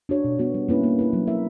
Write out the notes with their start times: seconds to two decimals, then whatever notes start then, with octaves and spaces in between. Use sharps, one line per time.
0.09 D4 F#4 C#5
0.24 B2
0.39 G3 B3 F#4
0.54 G3
0.69 A#3 C#4 E4 B4
0.83 A#3
0.99 E4 B4
1.13 F#3
1.27 A#3 E4 A#4 E5